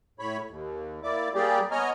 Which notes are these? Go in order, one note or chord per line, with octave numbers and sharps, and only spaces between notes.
A2 C#5 B5
D#2
A#3 E4 D5 D6
G3 A#3 G4 G#4 D5
B3 C#5 D#5 G#5 A#5 F6